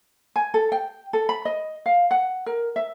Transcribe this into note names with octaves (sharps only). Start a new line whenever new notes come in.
G#5
A4
G5
A4
B5
D#5
F5
F#5
A#4
E5